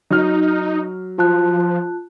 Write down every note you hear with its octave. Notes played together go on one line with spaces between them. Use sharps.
F#3 D#4 F6
F3 F4 A5 F#6